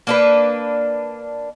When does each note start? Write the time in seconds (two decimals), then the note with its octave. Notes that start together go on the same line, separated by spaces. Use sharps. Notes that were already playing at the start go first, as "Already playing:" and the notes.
0.07 A#3 D4 B4